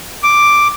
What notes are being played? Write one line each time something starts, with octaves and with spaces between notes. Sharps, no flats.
D6